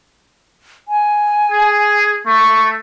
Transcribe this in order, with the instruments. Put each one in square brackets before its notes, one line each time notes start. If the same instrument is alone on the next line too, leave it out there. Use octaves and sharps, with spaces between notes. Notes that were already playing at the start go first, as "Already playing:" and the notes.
[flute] G#5
[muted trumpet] G#4
[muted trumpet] A3 [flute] C#6